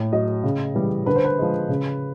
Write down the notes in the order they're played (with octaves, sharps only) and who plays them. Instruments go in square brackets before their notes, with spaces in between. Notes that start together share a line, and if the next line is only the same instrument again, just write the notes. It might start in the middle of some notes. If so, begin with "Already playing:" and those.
Already playing: [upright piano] A2
F#3 D#5
C#3
E3 G3
D3 B4
C5
B4
F3 G#3
C#3